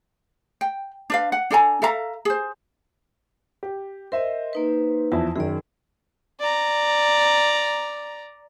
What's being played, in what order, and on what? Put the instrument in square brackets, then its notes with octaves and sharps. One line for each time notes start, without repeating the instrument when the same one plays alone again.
[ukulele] G5
D4 B4 F5
F#5
D4 A4 G#5 A#5
A4 E5 F5 A#5
G#4 C5
[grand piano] G4
[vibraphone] A#4 D#5 [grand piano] C5 E5
[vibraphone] A#3 D#4 B4
[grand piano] E2 F3 E4 [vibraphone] A5
[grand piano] F#2 D#3 [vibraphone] G#4 D5
[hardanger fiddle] D5 A#5